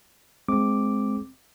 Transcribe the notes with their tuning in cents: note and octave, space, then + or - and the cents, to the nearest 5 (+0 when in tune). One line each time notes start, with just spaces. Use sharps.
G#3 +15 C4 +0 D6 +0